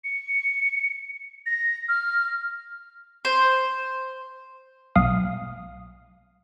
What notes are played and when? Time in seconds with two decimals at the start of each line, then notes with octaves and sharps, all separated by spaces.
0.04 C#7
1.46 A#6
1.89 F6
3.25 C5
4.96 B1 F5 D#6